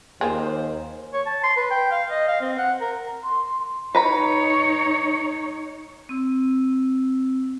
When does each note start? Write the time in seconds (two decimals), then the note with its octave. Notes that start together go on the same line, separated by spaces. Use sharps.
0.21 D#2 A#3 F4 G4 G#4 C5
1.13 C#5
1.26 A5
1.44 C6
1.56 B4
1.71 G5
1.91 F5
2.10 D#5
2.28 F5
2.41 C4
2.58 F#5
2.80 A#4
3.23 C6
3.95 D#4 B4 C#5 A#5 B5
6.09 C4 E6